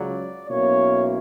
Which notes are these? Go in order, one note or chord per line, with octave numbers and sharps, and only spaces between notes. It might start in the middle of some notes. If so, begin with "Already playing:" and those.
Already playing: C#2 C#3 F#3 D5
B1 B2 A#3 C#4 E4 C#5